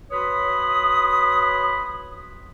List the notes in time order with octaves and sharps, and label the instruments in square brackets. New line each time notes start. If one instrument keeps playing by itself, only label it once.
[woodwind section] F#4 B4 C#5 B5 C6 D#6